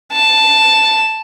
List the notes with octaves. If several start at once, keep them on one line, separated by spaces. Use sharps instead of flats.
A5